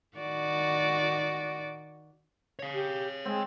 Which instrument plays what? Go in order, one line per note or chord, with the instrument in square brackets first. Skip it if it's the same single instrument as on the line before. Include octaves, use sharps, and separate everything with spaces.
[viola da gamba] D#3 F#4 D5
[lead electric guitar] C#5 F5
[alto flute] G4
[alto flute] G#3 [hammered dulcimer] C4